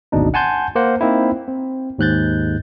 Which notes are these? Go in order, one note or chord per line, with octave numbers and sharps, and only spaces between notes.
G#1 D2 B2 D4 D#4
F#5 G#5 A5 C6 G6
A#3 C5 F#5
A#3 C4 D#4 E4
C4
D#2 G#2 F#6 G6 A6